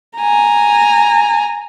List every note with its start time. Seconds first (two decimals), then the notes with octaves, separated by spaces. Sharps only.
0.17 G#5 A#5